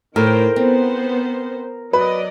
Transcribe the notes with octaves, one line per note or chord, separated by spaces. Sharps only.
A2 D#3 A#4 C5 G5
B3 C4 C5
F#3 B4 D5 D#5